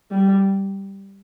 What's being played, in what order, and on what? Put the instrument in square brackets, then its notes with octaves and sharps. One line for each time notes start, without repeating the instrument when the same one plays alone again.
[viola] G3